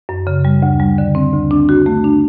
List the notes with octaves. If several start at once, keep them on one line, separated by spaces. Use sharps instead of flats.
F#2
C#3
G3
D2
G3
D3
C4
D2
D4
F#4
A3
D4